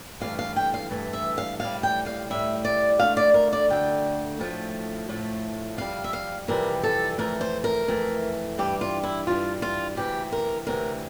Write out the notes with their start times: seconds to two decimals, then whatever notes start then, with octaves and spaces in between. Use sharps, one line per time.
0.20 G2 E3 A3 F5
0.39 F5
0.56 G5
0.74 F5
0.90 G2 E3 A3
1.13 E5
1.38 F5
1.60 A2 G3 F5
1.83 G5
2.06 F5
2.30 A2 G3 E5
2.65 D5
3.00 D2 D3 A3 F5
3.17 D5
3.34 A#4
3.53 D5
3.69 D2 D3 A3 G5
4.39 A2 F3 A3
5.09 A2 F3 A3
5.78 F2 C3 G3 F5
6.04 E5
6.13 F5
6.48 F2 C3 E3 G3 A#4
6.83 A4
7.18 F2 E3 A3 A#4
7.41 C5
7.64 A#4
7.88 F2 E3 A3
8.58 G2 E3 G3 G4
8.81 F4
9.03 E4
9.27 G2 E3 G3 F4
9.62 F4
9.96 D2 C3 E3 G4
10.32 A#4
10.67 D2 C3 E3 A#4